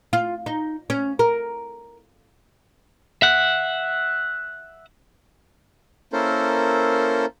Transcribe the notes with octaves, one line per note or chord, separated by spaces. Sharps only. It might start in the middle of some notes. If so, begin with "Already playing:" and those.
F4
D#4
C#4
A#4
E5 F#5
A#3 C#4 E4 A4 A#4 C5